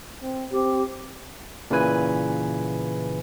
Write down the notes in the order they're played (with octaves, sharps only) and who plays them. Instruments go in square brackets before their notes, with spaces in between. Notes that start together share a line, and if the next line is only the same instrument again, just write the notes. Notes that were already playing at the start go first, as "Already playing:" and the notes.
[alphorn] C4
[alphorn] C4 [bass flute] G4
[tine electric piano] A#2 C#3 E3 B4 G#5